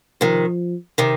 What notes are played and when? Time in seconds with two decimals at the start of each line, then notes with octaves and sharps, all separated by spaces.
0.21 C3 D#3 F3
0.98 C3 D#3